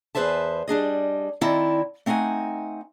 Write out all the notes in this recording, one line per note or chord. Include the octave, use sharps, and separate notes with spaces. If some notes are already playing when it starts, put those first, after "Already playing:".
E2 G#4 B4 C5 E5 A5
G3 D4 G#4 D#5
D#3 C4 E4 D5 D#5 A5
A3 C4 D#4 F#5 G#5